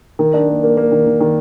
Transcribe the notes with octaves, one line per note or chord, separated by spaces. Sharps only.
D#3
D4
A#3
A#3
A#3
D#3
D#3
D#3